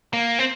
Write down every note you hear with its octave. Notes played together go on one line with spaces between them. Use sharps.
A#3
C4